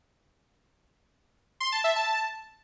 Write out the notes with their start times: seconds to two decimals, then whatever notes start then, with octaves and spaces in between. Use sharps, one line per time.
1.60 C6
1.72 A5
1.84 E5
1.96 A5